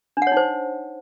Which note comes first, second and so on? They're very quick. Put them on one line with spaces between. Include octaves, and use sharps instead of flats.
D4 F#5 C#5 D#4 C5